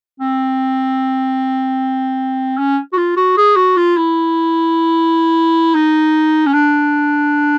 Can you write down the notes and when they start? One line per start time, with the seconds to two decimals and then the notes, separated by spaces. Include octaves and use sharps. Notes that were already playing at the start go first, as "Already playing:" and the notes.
0.20 C4
2.57 C#4
2.92 F#4
2.97 F4
3.16 F#4
3.37 G#4
3.56 F#4
3.77 F4
3.97 E4
5.75 D#4
6.46 C#4
6.53 D4